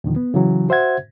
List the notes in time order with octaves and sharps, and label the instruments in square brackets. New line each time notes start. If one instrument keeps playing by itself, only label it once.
[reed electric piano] D#2 A#2 D3 D#3 F3
B3
C#3 E3 F#3
F#4 C5 E5 F#5 G#6